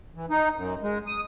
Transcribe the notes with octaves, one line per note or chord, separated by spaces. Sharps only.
E3
D#4
F#2
G#3
D#6